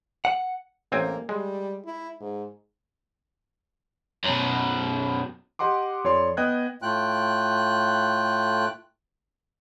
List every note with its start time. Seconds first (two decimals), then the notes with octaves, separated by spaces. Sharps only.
0.25 F#5
0.92 A1 A#3 C4 G#5
1.29 G3 G#3
1.85 E4
2.20 G#2
4.24 F#2 B2
5.59 G4 D#5 F#5 C6 D6
6.04 F2 C#5 D5 C6
6.37 B3 D#5 G5 F#6 G#6
6.82 A2 A3 F4 G5 F#6